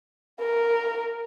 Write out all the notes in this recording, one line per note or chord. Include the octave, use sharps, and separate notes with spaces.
A#4